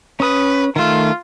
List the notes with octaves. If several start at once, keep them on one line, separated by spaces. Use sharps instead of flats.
C#4 B4 D#6
D#3 A3 F4